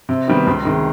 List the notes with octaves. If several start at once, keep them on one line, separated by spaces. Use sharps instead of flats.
C3
D#3 G3 B3
C#2
C3 D#3 G#3